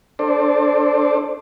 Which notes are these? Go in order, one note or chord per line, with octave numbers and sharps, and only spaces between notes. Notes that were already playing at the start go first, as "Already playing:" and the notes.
D4 A4 C5 D5